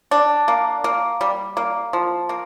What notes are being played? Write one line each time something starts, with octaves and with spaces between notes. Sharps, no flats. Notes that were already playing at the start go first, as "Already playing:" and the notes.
D4
A#3
A#3
G3
A#3
F3
A#3